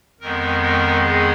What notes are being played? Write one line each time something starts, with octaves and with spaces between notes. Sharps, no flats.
F2 D#3 G#3 B3 A#4
A#4
G#4